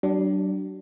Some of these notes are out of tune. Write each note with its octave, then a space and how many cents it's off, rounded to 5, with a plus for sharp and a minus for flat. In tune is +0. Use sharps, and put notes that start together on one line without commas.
F#3 +45 D4 +0